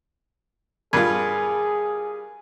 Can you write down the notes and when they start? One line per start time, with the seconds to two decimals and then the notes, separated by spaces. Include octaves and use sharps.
0.93 G2 F4 G#4 A#4 B5 G#6